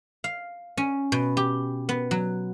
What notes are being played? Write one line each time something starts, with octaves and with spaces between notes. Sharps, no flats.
F5
C#4
B2
G4
B3
F#3